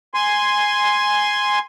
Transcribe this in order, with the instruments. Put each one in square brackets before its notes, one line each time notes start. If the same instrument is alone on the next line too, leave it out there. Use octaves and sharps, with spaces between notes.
[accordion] G#5 C6